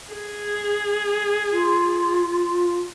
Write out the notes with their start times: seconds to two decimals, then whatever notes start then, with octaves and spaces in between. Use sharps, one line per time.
0.13 G#4
1.52 F4